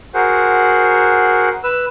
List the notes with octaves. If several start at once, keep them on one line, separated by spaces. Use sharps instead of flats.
F#4 G#4 A#4 C5 F#5
B4 E6